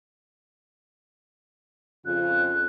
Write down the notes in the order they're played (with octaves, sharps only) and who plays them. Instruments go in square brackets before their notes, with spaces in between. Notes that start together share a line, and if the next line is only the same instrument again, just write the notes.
[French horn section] F2 C#3 F4 [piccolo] F#6